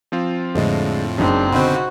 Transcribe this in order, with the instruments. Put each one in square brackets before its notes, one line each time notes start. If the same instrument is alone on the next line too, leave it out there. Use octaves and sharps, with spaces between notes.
[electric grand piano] F3 C4 F4
[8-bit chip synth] F2 A2 [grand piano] D3 G#3 D#5
[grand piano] F#1 F#3 [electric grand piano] C#3 D#4 [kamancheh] C4 D4
[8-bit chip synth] B2 D3 C4 [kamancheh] F#4 [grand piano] C5 D#5 B5